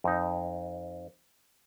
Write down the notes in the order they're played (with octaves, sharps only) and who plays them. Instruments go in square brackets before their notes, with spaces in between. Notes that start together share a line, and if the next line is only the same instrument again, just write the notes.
[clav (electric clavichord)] F2 D#4